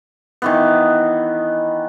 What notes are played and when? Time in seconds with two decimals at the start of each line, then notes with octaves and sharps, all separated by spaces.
0.42 D#3 E3 B3